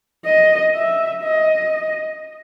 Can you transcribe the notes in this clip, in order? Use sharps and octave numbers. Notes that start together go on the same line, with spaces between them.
D#5
E5
D#5